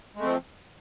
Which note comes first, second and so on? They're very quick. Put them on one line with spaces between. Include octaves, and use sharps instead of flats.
G#3 A3 C4 F3